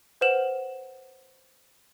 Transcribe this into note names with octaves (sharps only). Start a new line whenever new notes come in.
B4 C5 F#5 F6 E7 F#7